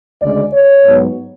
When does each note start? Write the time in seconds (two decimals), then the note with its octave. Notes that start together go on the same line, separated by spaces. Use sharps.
0.20 D2 C#3 G#3 D5
0.53 C#5
0.85 G#2 F#3 B3